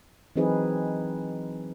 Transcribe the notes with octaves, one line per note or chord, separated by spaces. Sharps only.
E3 F#3 C4 D#4 G#4 B4